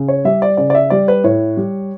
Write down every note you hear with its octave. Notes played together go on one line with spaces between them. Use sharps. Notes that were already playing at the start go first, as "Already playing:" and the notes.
Already playing: C#3
C#5
G3 E5
D5
C#3 D5
D5
E5
G3 D5
B4
A2 C#5
G3